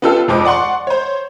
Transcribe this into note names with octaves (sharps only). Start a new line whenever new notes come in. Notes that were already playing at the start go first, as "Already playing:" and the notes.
B3 C#4 F4 G4 A4
F1 F2 F3 G#3 D6
D5 F#5 C6 C#6
C5 C#5